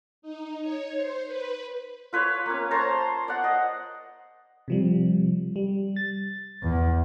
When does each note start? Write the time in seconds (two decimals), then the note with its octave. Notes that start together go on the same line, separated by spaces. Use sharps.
0.22 D#4
0.61 C#5
0.96 C5
1.27 B4
2.13 F4 B4 C#5
2.46 A#3 C#4
2.71 C5 C#5 A5 A#5
3.28 D5 F#5
3.44 D#5
4.68 C3 F3 G3
5.56 G3
5.96 A6
6.63 E2